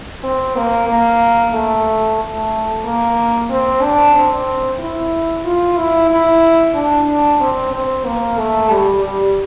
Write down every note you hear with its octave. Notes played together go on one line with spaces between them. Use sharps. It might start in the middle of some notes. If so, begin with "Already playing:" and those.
C4
A#3
A#3
A3
A3
A#3
C4
D4
C4
E4
F4
E4
E4
D4
C4
C4
A#3
A3
G3
G3